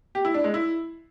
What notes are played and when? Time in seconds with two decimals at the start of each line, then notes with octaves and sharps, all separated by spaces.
0.15 G4
0.25 E4
0.34 D4
0.44 G#3
0.54 E4